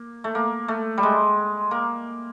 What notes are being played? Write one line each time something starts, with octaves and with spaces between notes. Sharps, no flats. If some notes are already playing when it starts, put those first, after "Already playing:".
Already playing: A#3
A3
A#3
A3
G3
G#3
A#3